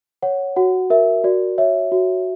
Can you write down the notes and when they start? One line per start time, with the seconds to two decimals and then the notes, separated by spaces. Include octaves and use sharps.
0.22 C#5 F#5
0.56 F#4 F#5
0.90 A#4 E5
1.24 F#4 D5
1.58 C#5 E5
1.92 F#4